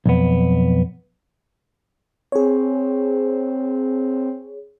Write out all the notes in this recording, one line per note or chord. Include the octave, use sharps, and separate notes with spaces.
B1 F2 B3
C4 G#4 C#5